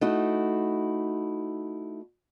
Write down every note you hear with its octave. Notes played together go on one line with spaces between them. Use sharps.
A3 D#4 E4 F#4